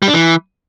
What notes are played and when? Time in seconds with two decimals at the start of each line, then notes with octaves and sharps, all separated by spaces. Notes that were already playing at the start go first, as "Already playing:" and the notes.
0.02 G3
0.08 D4
0.13 E3